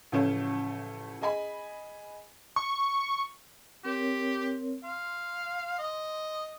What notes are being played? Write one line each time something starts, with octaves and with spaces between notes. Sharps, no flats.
A1 C#3 F3 A3 C#4 F5
G#4 D#5 G#5 B5
C#6
C4 G4 A#4 C#5
F5 C6
D#5